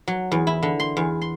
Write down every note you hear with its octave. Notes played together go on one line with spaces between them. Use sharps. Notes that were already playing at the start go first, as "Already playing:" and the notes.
F#3
E2
E4
D3
C6
E2
C6